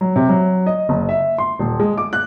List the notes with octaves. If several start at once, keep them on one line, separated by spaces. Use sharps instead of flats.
F#3
C3
F#3
D#5
F#1
E5
C6
D#1
G#3
D6
F#6